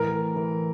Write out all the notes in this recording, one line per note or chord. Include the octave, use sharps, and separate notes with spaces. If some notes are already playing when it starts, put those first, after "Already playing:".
Already playing: A2 E3 A#4
E3